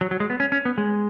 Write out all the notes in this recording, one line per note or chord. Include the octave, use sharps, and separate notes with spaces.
F#3
F#3
G#3
B3
C#4
C#4
B3
G#3